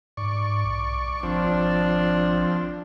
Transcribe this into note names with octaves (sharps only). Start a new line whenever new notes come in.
G#2 D5 C#6
B1
G#1 F3 C4 D4